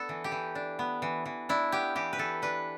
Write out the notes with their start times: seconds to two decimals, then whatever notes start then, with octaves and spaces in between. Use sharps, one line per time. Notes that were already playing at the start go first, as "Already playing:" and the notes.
Already playing: B3 D4 A4
0.09 E3
0.24 G4
0.32 E3
0.55 D4
0.79 B3
1.02 E3
1.26 E3
1.49 D4 E4
1.72 B3 G4
1.95 E3 G4
2.13 B4
2.18 E3 A4
2.42 D4 B4